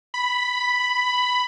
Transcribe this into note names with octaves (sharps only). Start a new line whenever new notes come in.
B5